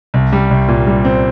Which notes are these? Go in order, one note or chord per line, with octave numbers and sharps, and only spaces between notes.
C2
G3
C2
A#2
G3
C4